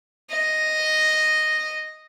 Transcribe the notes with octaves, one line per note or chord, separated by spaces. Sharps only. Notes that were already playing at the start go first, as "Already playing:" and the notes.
D#5